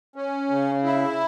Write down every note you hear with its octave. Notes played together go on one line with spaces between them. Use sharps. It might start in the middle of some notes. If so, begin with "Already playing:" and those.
C#4
C#3
E4